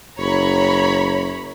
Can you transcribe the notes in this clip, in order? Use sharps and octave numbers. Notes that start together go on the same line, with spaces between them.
F#1 C#5 A#5 B5